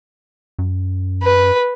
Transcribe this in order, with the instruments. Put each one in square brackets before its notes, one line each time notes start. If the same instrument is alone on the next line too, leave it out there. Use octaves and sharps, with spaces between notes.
[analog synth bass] F#2
[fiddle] B4